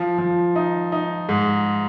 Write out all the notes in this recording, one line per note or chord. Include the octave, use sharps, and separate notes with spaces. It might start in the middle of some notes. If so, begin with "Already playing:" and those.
Already playing: F3
F3
D#4
D#4
G#2